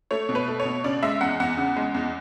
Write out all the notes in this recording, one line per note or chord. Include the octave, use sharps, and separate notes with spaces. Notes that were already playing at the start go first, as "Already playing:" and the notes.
A3 C#5
B2
B4
A3
C#5
B2
C#3 D5
G#3 E5
E2 F#5
E2 F#5
C#3
G#3
E2